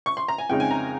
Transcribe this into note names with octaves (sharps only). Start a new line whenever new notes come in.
C#6
C6
A#5
G#5
F2 C#3 G#3 D#4 G5
G#5
A#5